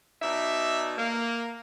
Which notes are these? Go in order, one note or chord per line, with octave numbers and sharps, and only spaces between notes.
B2 D#4 D5 E5
A#3